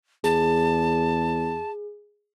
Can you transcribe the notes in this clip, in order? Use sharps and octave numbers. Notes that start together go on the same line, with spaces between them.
E2 G#4 A5